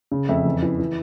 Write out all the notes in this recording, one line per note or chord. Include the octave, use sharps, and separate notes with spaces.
C#3
F2 E5
E2
E3
E3